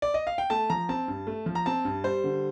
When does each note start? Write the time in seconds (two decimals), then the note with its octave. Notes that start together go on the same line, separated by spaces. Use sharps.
0.02 D5
0.14 D#5
0.27 F5
0.38 G5
0.50 A3 A5
0.70 F3 A#5
0.89 C4 A5
1.08 G2
1.27 A3
1.46 F3
1.55 A#5
1.66 C4 A5
1.85 G2
2.04 G3 C5
2.24 D3